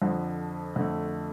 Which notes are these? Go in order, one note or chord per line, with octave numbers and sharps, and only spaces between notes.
F2 D3 F3
F2 D3 A3